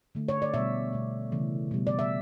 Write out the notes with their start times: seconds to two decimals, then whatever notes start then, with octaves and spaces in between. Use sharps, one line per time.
0.15 D3 A3
0.28 C#5
0.42 D5
0.54 B2 G3 E5
0.93 B2 A3
1.32 C#3 E3 A3
1.71 B2 G3
1.87 D5
1.99 E5